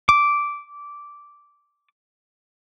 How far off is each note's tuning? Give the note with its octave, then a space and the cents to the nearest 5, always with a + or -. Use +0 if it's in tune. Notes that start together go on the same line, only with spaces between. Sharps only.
D6 -10